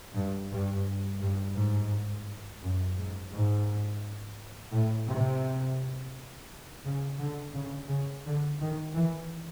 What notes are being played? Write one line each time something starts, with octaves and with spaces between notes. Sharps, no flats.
G2
G2
G2
G#2
F#2
G#2
G#2
A2
C3
C#3
D3
C#3
C#3
D3
D#3
E3